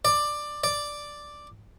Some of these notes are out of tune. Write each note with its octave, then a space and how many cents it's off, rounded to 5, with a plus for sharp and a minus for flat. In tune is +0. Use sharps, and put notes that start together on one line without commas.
D5 +10
D5 +0